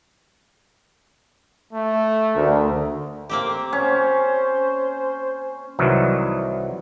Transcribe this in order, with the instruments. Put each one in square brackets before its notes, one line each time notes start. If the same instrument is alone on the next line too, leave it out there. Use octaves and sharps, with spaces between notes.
[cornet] A3
[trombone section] D2 [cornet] A#4
[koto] A#3 C4 G4
[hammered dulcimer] C#4 [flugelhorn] C5
[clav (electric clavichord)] C2 D#3 E3 F#3